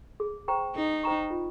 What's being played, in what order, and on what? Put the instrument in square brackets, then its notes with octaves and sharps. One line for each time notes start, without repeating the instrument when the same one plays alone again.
[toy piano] G#4
C5 G5 A#5 C#6
[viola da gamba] D#4 [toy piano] G#4
[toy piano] C5 G5 A#5 C#6
F4